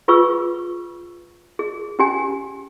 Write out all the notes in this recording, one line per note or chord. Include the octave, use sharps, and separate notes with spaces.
F4 G#4 B4 C#6 E6
G#4
C#4 G4 G#5